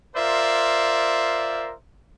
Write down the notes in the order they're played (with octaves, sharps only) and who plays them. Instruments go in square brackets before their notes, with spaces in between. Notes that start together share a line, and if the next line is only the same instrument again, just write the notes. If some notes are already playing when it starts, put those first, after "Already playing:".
[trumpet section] F4 A#4 C5 D5 E5